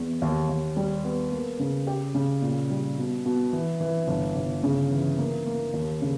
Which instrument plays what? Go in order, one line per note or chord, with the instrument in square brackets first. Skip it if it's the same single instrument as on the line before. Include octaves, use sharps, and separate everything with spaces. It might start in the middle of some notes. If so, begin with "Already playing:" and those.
Already playing: [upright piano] E2
D#2
D#2
G3
B3
A#3
C#3
G4
C#3
A#2
G3
B2
B2
E3
E3
G1
G1
C#3
E3
A#3
A#3
D#2
C#3